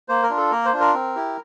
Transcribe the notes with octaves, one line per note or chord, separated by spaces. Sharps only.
A#3 C5
A#4
D4 F4
A4
A#3 A#4
C5
D4 F4
A#4
C4
E4 G4